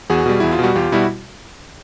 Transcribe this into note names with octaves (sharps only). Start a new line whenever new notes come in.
E2 F#4 G#4
B2 G3
E2 E4
F4
B2 G3 F#4
E2 F4 G4
B2 G3 E4 F#4